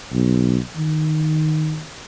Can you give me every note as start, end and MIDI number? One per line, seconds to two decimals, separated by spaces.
0.13 0.58 35
0.76 1.80 51